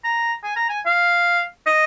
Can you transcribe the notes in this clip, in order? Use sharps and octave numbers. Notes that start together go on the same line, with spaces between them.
A#5
G#5
A#5
G#5
F5
D#5